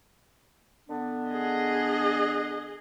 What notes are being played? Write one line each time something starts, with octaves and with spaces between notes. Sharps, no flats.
D3 B3 D4
G#4 D#5